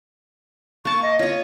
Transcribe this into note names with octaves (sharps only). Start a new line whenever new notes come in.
A#3 A5 C#6
D#5
F4 C#5 D#5